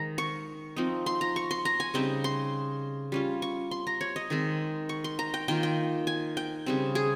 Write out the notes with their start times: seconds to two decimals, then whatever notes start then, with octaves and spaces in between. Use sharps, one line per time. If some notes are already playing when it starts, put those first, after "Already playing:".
Already playing: D#3 G#3 D#4 A#5
0.18 C#6
0.77 F3 C4 D#4
1.06 C6
1.21 A#5
1.36 C#6
1.51 C6
1.65 A#5
1.80 G#5
1.94 C#3 G3 C4 D#4 G5
2.24 C6
3.12 G3 C#4 F4
3.42 C#6
3.71 C6
3.87 A#5
4.01 C#5
4.16 D#5
4.30 D#3 G#3 C4
4.89 C#6
5.04 C6
5.19 A#5
5.34 G5
5.48 D#3 A#3 F4 G5
5.63 G5
6.07 G#5
6.37 G5
6.66 C#3 G3 C4
6.95 G#4